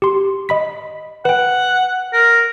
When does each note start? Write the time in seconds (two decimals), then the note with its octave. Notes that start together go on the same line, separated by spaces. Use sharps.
0.02 G4 C6
0.49 D#5 B5 B6
1.25 B4 F#5 G5
2.13 A#4